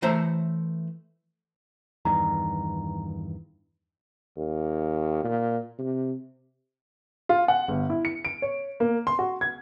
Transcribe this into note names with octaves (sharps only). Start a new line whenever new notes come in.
E3 A3 C5 A#5
E2 G2 D#3 A#5
D#2
A#2
C3
F4
F#5
G1
E4
C#7
D7
C#5
A#3
C6
F#4
G#6